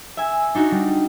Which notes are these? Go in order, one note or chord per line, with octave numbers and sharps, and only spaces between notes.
E5 G#5
D4 D#4 F#4
G3